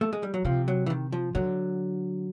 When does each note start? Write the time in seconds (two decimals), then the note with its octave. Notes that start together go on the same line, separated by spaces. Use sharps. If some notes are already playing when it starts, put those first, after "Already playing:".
0.01 A3
0.13 G#3
0.23 G3
0.34 F#3
0.45 C3 F3
0.68 F#3
0.86 E3
0.90 D#3
1.12 F3
1.35 D3 F#3